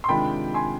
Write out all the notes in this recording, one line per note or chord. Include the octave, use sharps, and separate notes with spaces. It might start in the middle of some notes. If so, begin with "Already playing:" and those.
C6
C3 D#3 G#3 D4 F4 G5 B5
G#5 C6